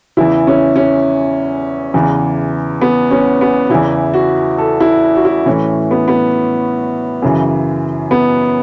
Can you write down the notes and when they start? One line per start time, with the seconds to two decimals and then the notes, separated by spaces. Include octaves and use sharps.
0.17 E2 C#3 E3 E4
0.47 C#4
0.76 C#4
1.94 E2 C#3 E3
2.81 B3
3.11 C#4
3.41 B3
3.70 E2 C#3 E3 E4
4.14 F#4
4.58 A4
4.80 E4
5.16 F#4
5.25 E4
5.46 A2 E3 C#4
5.91 B3
6.08 B3
7.22 F#2 C#3 E3
8.11 B3